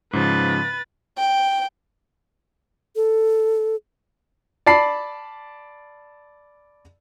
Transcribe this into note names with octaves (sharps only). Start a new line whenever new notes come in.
G#2 C#3 F3 B4 A6
G5
A4
D5 A5 B5 C7